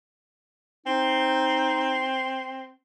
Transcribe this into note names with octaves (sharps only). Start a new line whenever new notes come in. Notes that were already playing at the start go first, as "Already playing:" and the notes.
C4 D#4